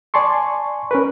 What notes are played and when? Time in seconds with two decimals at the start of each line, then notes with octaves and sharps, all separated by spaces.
0.14 D5 G#5 A5 C6 C#6
0.91 C#4 A#4 B4